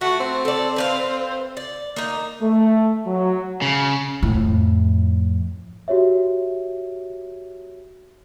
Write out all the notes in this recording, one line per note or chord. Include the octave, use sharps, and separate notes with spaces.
A3 F#4
C4
A4 D5
B4 C5 F5
D5
A#3 D#4
A3
F#3
C#3
F2 A2
F#4 G4 C#5 E5